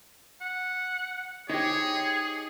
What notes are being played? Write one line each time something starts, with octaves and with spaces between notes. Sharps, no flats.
F#5
D#4 G4 G#4 C5 C#5